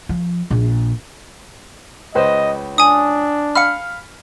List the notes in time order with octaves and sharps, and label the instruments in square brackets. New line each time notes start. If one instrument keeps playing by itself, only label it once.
[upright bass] F3
A#1
[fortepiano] C#2 B4 C5 [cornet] D#5
[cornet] D4 [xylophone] G#5 D#6
[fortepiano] F5 B5 [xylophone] F6 C#7